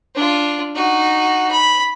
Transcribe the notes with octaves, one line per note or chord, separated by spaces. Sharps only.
D4 F4
D#4 F#4
B5